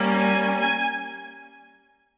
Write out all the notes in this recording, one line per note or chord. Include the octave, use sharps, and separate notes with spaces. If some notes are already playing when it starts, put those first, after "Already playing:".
Already playing: G3 A#3 C#4
G#5
G#5